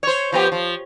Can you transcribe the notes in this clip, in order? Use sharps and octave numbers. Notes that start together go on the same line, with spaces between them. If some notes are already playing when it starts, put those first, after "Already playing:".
C5 C#5
F3 B3 G4
F3